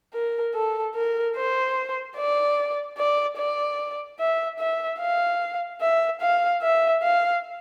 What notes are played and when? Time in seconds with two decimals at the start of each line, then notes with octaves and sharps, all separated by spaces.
0.14 A#4
0.54 A4
0.95 A#4
1.36 C5
2.17 D5
2.98 D5
3.38 D5
4.19 E5
4.59 E5
5.00 F5
5.81 E5
6.21 F5
6.62 E5
7.02 F5